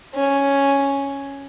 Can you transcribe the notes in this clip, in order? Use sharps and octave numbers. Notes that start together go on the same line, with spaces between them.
C#4